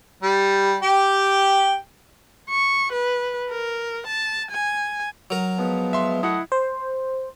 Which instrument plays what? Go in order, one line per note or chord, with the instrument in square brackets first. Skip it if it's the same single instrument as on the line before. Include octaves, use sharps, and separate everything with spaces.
[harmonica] G3
G4 G5
[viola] C#6
B4
A#4
A5
G#5
[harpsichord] F#3 A#4
[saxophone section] F3 G#3 B3
[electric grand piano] E5 C6
[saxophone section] A3 D#5 F#5 [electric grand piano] E4
[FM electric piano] C5